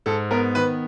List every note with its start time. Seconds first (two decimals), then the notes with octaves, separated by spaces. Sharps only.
0.06 G#2 A4
0.31 B3 A#4
0.55 D#3 B4